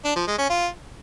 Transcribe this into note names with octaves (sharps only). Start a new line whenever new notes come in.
D4
F3
G#3
C#4
F4